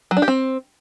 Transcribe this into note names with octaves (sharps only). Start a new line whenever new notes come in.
F#3
D4
G4
C4